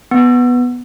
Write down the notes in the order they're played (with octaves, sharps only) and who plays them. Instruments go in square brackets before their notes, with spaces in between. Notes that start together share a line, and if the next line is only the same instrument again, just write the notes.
[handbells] B3